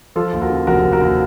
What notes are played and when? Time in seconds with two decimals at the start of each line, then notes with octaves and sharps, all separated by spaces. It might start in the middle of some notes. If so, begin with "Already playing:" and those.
0.16 F3 F4 A4
0.33 D#2
0.42 F#4 A#4
0.50 C#3
0.67 F1 F#4 A#4
0.84 F1
0.92 F#4 A#4
1.01 D#2